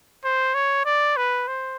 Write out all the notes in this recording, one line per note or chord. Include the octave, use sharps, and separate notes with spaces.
C5
C#5
D5
B4
C5